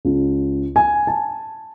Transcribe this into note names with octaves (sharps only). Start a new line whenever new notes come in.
C#2
G#5
A5